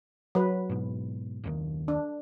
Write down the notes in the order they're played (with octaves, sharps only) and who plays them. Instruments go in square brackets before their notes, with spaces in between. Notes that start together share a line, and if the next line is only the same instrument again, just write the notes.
[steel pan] F#3 B4
[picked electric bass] G#2 B2
F#1 D#2 D#3
[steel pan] D4